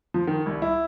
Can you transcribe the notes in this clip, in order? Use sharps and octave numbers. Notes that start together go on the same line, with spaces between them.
F3
D#3
C2
E4